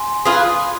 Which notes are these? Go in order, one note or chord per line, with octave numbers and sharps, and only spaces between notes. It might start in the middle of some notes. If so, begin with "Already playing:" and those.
Already playing: G#5 C6
F4 G#4 B4